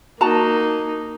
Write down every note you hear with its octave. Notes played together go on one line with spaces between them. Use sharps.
A#3 D#4 F#4 A5 A#5